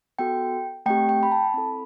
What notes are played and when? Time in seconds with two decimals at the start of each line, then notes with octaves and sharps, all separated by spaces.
0.19 B3 F#4 A4 G5
0.86 A3 C4 G4 G5
1.09 G5
1.23 B5
1.32 A5
1.54 C4 E4 A4 B5